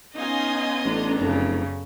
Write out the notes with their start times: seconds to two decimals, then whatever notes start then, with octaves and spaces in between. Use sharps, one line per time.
0.16 B3 C#4 D#4 D#5 F5 G#5 C6
0.85 A1 D4 A4 A#5
1.19 F1 F#2 C#3